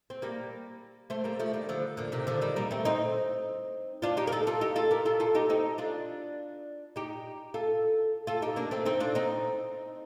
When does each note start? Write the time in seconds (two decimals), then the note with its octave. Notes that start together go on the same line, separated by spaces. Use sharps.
0.10 C4
0.22 G3 A#3
1.10 A3 C4
1.24 G3 A#3
1.39 F3 A3
1.53 D#3 G3
1.69 D3 F3
1.97 A#2 D3
2.12 C3 D#3
2.27 D3 F3
2.41 D#3 G3
2.56 G3 A#3
2.71 A3 C4
2.85 C4 D#4
4.02 D4 F4
4.17 D#4 G4
4.27 A#4
4.32 F4 A4
4.47 F4 A4
4.61 D#4 G4
4.75 F4 A4
4.91 G4 A#4
5.05 F4 A4
5.20 F4 A4
5.35 D#4 G4
5.49 C4 D#4
5.78 D4 F4
6.96 D#4 G4
7.54 F4 A4
8.27 F4 A4
8.42 D#4 G4
8.56 A#3 D4
8.71 A3 C4
8.85 C4 D#4
9.00 D4 F4
9.15 C4 D#4